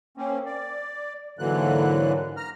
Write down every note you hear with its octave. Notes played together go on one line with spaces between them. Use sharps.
A#3 C4 C#4
D5
G#2 D3 E3 F#3 A#3 F#6
A#5 F6